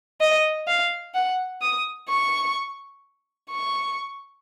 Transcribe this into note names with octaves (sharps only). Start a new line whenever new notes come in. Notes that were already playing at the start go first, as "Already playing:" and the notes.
D#5
F5
F#5
D#6
C#6
C#6